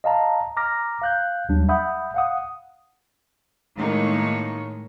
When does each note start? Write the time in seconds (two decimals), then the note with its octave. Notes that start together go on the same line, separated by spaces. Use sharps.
0.04 D#5 F5 A5 A#5
0.57 A#5 D6 F6 A#6
1.02 F5 F#6 G6
1.49 D#2 F#3 G3 D4
1.69 E5 F#5 B5 D#6 G6
2.14 F5 F#5 D#6
3.77 A2 D#3 G#3 A#3 D#4 C#5